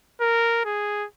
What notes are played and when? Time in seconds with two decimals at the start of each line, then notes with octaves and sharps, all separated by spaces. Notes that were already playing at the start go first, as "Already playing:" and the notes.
0.21 A#4
0.66 G#4